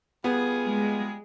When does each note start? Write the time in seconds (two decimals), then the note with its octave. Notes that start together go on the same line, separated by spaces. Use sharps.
0.24 G3 B3 F4 G#4
0.65 G#3